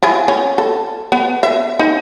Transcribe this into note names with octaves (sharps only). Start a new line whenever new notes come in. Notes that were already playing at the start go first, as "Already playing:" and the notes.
E4 F4 G#4
C#4
A4
B3
E5
D#4